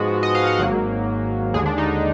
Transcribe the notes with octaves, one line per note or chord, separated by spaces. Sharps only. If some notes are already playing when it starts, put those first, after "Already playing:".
Already playing: G#2 F3 G#3 B3 F#4
D#5
F5
F#5
G#1 G#2 F#3 A#3
D#2 D3 G#3 G#4
D4
D#4